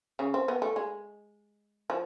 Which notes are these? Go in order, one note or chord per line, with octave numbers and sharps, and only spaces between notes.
C#3 C#4
C4
B3
A3
G#3
F3